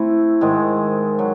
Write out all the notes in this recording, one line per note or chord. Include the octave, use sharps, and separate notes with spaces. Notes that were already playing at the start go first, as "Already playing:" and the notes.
Already playing: A3 C4 E4
G#2 D#3 G#3
F#3